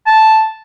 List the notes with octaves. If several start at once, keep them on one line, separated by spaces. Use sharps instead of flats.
A5